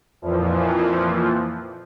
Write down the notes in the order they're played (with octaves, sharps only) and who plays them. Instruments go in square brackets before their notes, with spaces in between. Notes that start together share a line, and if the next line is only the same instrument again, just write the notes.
[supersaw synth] F2 A#2 E3 F3